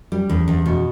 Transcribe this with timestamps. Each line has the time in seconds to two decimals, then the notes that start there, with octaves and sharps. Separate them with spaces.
0.12 G3
0.29 E2
0.48 E2
0.66 B2